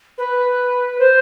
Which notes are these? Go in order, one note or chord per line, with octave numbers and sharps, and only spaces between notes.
B4
C5